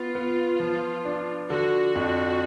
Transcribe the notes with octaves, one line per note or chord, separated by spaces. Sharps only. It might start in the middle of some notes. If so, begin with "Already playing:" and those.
Already playing: B3 F4
B3
F3
D4
D3 F#4
F2